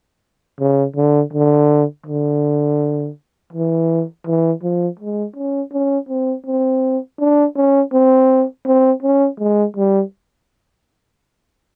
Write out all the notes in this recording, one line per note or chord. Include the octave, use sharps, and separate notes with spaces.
C#3
D3
D3
D3
E3
E3
F3
G#3
C#4
C#4
C4
C4
D4
C#4
C4
C4
C#4
G#3
G3